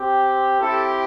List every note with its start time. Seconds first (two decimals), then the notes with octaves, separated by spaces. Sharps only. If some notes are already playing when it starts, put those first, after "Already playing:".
Already playing: C4 G4
0.60 C4 E4 G4 A4